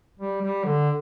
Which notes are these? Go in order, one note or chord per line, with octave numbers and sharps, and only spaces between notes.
G3
G3
D3